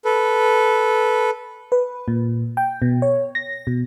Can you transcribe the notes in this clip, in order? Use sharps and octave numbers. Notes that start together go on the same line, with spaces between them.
A4 B4
B4
A#2
G5
B2
C#5
A#6
B2